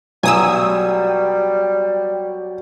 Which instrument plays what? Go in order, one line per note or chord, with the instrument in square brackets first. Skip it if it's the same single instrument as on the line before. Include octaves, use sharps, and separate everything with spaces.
[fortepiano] B1 [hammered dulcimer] F#3 [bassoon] G3 [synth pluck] G#5 D#6 E6